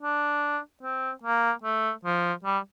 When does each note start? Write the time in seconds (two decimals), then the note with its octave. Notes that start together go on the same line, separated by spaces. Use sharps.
0.02 D4
0.83 C4
1.23 A#3
1.64 A3
2.05 F3
2.44 G3